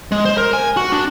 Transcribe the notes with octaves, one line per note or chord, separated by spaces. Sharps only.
G#3
C5
A#4
G#5
F#4
D4